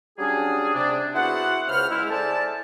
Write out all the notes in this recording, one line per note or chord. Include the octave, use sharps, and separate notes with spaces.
F#3 G3 C#4 D4 G#4
C3 D4
B3 E4 F#4 G#4 C5 F#5
C#2 C#3 C5 B5 F6
G#3 E4
G#4 A4 C5 D5 E5 A5